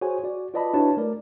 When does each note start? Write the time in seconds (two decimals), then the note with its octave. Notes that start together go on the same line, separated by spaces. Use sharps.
0.01 F#4 G#4 C5 C#5 G#5
0.24 F#4 D5
0.54 F4 B4 D5 D#5 A5 B5
0.74 D4 E4 F#4 B4 C#5 A5
0.97 A3 A#4 D5